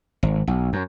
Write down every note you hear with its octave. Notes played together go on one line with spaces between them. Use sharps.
G#1
B1
F#2